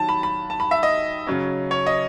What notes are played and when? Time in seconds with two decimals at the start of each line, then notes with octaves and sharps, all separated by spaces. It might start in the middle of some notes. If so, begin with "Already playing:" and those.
Already playing: D#3 F#3 A5
0.09 B5
0.23 B5
0.50 A5
0.60 B5
0.71 E5
0.83 D#5
1.27 C#3 F#3 C#4
1.71 C#5
1.87 D#5